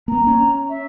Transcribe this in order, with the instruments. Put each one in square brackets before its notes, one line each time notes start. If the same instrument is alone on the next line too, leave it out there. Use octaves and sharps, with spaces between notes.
[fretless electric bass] A#3 B3 [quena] A#5
[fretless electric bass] C#4
[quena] E5